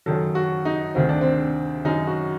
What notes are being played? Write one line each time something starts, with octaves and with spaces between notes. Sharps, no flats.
F#2 D#3 F#3 A4
F#4
D#4
D2 C3 D#3 C4
D4
C4
F#2 D#3 F#3 D#4
F#4